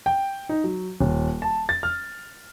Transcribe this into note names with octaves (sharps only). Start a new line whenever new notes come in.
G5
D#4
F#3
D#1
A5
A6
F6